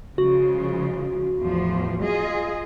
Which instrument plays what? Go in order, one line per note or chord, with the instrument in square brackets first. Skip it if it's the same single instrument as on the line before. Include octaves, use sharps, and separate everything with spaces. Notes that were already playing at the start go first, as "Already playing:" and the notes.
[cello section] C#3 F3 G#3 [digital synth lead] F#4
[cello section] E2 A2 F3
F4 G#4 D#5